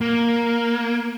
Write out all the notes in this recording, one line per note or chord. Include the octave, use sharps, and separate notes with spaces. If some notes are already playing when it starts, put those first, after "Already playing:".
A#3